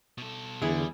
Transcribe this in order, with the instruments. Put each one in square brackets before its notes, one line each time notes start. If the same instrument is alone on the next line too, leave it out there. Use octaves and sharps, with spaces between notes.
[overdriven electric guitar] B2 A4
[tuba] E2 [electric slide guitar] D3 [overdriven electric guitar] G3 [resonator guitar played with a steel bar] E4 G#4